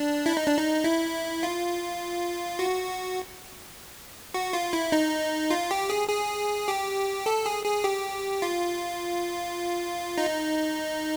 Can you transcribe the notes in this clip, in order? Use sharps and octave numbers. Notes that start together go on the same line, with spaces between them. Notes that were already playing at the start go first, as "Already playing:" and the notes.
Already playing: D4
E4
D#4
D4
D#4
E4
F4
F#4
F#4
F4
E4
D#4
F4
G4
G#4
G#4
G4
A4
G#4
G#4
G4
F4
D#4